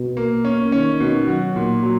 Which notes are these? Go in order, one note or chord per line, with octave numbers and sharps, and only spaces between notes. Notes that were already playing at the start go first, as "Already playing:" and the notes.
Already playing: B2
A#3
C#4
D#3 C#4
B2
F#3 F#4
A#2
F#3